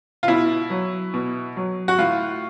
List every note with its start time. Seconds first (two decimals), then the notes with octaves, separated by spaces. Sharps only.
0.23 F4
0.28 B2 E4
0.70 F#3
1.14 B2
1.57 F#3
1.88 F#4
1.99 A2 F4